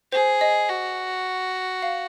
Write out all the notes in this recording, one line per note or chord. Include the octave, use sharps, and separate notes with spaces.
G#4 C5
D#5
F#4
F5